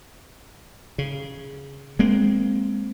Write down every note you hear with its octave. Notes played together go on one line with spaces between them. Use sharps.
C#3
G#3 A#3 C4